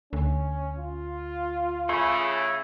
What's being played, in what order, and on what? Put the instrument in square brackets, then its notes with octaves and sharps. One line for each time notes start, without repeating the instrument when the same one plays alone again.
[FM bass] D2 [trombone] C#4
[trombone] F4
[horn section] C#3 A3 [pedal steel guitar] E4 G#4 C6